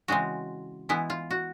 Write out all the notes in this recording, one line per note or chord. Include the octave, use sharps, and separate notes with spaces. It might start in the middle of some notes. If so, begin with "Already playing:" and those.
C#3 E3 G#3 C4 F#4
E3 G#3 B3 E4
F4
F#4